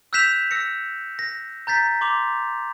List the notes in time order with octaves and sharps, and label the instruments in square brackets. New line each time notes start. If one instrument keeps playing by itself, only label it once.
[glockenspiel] E6 F#6 G6 B6 E7 F7
E6 A#6 C#7
A#6
A#5 G6 A6 B6
C6 D6 F7